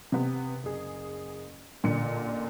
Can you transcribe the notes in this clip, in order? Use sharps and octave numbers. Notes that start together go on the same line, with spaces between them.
C3 B3
F#1 G#4
A1 A#2 D3 C#7